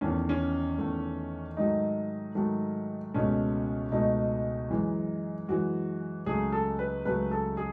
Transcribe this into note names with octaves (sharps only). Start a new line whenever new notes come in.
E2 D#3 A3 C#4
C#4
E2 D#3 A3
G#2 D#3 F#3 A3 D#4
G#2 D#3 F#3 A3
C#2 B2 A3 C#4
C#2 B2 A3 D#4
F#2 E3 G#3
F#2 E3 G#3 F#4
C#2 C#3 F#3 A3 G#4
A4
B4
C#2 C#3 F#3 A3 B4
A4
G#4